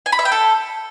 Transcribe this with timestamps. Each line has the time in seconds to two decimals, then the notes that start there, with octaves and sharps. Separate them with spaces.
0.06 G#5
0.12 B5
0.19 E5
0.25 G5
0.32 A4